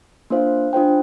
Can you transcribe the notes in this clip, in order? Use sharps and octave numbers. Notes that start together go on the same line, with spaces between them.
A#3 D4 F4 C5 F5
D4 F4 C5 G5